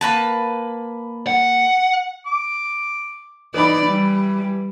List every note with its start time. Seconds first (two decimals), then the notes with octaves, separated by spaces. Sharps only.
0.01 A#3 B4 A5
1.27 F#5
2.26 D6
3.54 E3 D#4 D5 B5
3.86 G3